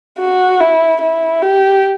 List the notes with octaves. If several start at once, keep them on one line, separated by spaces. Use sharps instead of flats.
F#4
E4
E4
G4